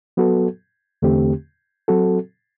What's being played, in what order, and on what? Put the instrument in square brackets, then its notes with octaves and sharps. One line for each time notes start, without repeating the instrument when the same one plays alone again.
[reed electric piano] F#3 B3 F#4 A4
E2 D3 A3 C4 G4
F#3 C4 F#4 A4